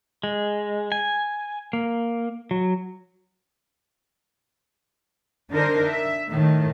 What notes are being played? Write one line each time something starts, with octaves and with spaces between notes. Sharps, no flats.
G#3
G#5
A#3
F#3
D3 D4 D#4 A#4 C5
E5
A2 D#3 A3